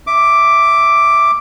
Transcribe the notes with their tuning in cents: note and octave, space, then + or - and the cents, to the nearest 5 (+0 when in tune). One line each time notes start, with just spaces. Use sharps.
E5 +0 D6 +0